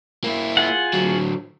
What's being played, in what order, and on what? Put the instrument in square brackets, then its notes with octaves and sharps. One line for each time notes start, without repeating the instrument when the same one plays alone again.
[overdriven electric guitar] A#3 E4
[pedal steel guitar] F4 G#4 F#5
[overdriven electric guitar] D3 F#3